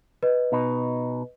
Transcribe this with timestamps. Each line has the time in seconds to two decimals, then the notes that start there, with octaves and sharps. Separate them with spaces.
0.23 B4 D#5
0.52 B2 D#4